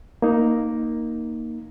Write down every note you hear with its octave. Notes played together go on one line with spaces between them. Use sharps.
A#3 D#4